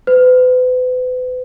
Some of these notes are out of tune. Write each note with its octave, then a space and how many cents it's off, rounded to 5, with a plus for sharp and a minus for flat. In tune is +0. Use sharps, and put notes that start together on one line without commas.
B4 +40